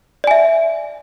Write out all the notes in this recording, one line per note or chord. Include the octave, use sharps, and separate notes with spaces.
D5 E5 G#5